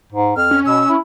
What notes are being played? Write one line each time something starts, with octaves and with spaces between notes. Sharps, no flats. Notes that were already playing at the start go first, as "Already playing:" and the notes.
G#2
F2 F6
C#4
B2 E6
E4